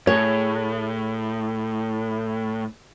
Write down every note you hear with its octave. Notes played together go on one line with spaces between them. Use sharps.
A2 G#4 C#5